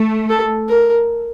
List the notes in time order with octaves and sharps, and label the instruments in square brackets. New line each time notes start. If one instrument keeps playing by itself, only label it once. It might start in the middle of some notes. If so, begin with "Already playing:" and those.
Already playing: [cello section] A3
[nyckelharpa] A4
A#4